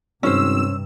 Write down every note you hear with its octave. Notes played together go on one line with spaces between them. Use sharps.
G#1 G2 C3 C#4 C5 E6